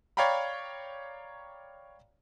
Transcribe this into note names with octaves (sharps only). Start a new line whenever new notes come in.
C#5 D5 F5 G5 A#5 B5